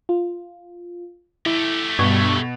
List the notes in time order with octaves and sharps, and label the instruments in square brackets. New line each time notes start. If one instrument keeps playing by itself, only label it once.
[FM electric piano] F4
[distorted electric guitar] A3 G4 [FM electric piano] E4
[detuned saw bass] G2 [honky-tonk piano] B2 [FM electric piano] C#6 G#6